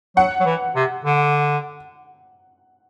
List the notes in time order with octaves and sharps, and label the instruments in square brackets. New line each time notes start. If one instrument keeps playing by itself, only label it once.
[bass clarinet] F#3 [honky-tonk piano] F#5
[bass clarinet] F#3
E3
C3
D3